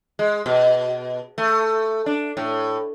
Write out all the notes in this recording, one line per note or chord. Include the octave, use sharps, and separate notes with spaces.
G#3
B2
A3
D4
A2